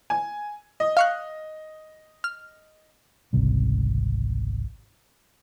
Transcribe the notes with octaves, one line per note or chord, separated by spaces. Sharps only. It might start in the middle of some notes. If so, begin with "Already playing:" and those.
G#5
D#5
F5 C#6 F#6
F6
G#1 C#2 C3 G3